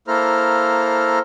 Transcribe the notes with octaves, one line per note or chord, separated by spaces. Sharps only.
A#3 E4 A4 C5 A#5 F6